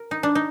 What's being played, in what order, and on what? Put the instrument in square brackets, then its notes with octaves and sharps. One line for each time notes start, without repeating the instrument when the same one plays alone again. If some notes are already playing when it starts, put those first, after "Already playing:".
Already playing: [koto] A#4
D#4
D4
D#4